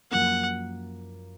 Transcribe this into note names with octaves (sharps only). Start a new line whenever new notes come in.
F#2 F3 A#3 F#5